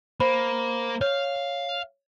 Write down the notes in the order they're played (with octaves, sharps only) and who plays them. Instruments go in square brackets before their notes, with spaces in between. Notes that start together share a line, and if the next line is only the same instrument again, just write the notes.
[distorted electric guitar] A#3 [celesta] C5 B5
[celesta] C#5 [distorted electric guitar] F5